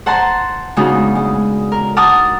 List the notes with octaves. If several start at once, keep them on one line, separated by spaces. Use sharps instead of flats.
C5 F#5 A5 A#5 C6
C#3 G#3 B3 D4 D#4 F#4
G#3
A#4
A#4 F#5 A5 D6 D#6 F6